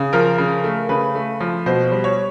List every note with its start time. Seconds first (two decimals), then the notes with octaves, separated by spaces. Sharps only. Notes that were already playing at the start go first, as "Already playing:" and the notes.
Already playing: C#3
0.13 F3 A#4
0.38 C#3
0.64 A3
0.89 C#3 B4
1.15 A3
1.40 F3
1.66 B2 C5
1.92 G3
2.04 C#5